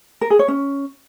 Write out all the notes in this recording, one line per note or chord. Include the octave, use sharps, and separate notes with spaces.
A#4
G#4
C#5
C#4